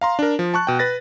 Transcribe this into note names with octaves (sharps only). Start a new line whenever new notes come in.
F5 A#5 C6
D4 A#4
F3
A5 C#6 F#6
B2 G5
B4 A6 A#6